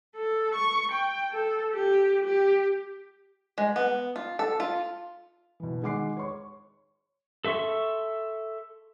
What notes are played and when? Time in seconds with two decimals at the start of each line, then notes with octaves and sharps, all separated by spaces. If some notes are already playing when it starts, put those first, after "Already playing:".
0.16 A4
0.55 C#6
0.92 G5
1.31 A4
1.73 G4
2.25 G4
3.58 G#3
3.76 B3
4.16 F4
4.39 A4
4.60 F4
5.60 B2 E3
5.82 D#3 G#3 F#5 D6 C7
6.17 C#5 C#6
7.44 A4 E5 C6 C#6